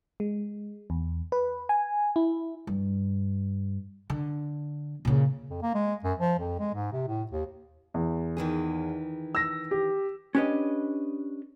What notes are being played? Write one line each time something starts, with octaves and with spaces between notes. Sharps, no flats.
G#3
E2
B4
G#5
E4
G2
D3
A#2 C#3
F2
A#3
G#3
F#2
F3
F2
G#3
G#2
C3
A2
D#2
E2
D#3 E3 G#4
E6 A#6
G4
C#4 D4 G4 B4 D#5